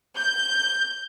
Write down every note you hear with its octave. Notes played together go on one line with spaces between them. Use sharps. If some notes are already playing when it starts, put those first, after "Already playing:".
G6